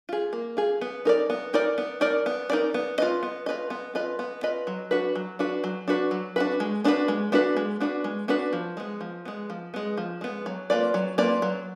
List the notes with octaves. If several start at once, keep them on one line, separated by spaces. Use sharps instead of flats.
F4 G#4
A#3
F4 G#4
B3
D#4 A#4 D5
B3
D#4 A#4 D5
B3
D#4 A#4 D5
B3
D#4 A#4 D5
B3
F4 B4 D#5
B3
F4 B4 D#5
B3
F4 B4 D#5
B3
F4 B4 D#5
F#3
D4 F#4 B4
F#3
D4 F#4 B4
F#3
D4 F#4 B4
F#3
D4 F#4 B4
G#3
B3 D4 F#4 B4
G#3
B3 D4 F#4 B4
G#3
B3 D4 F#4 B4
G#3
B3 D4 F#4 B4
F3
G#3 B3
F3
G#3 B3
F3
G#3 B3
F3
G#3 B3
F#3
A#3 F4 B4 D5
F#3
A#3 F4 B4 D5
F#3